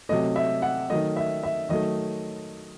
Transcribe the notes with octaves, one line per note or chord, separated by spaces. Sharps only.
C3 F#3 A3 D#5
E5
F#5
D#3 F#3 A3 D#5
E5
E5
D#3 F#3 A3 D#5